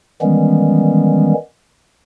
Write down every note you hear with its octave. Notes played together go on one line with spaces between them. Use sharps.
D#3 E3 G3 G#3 B3 C#4